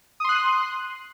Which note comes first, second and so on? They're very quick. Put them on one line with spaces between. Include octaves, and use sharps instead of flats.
D#6 C6 F#6